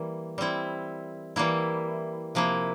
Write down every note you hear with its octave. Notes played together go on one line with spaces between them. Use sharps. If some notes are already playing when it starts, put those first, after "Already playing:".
Already playing: E3 G3 A#3
G3 C4 E4
E3 G3 A#3 E4
C3 F3 A#3 E4